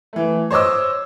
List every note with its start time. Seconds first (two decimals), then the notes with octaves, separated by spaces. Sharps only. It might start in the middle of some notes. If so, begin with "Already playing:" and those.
0.13 E3 A3
0.51 C5 C#5 D#5 D6 E6